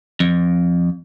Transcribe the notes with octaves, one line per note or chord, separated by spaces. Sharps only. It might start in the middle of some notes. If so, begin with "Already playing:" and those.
F2